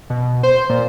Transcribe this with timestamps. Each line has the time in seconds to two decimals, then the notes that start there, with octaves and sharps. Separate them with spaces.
0.10 B2
0.43 C5
0.69 A#2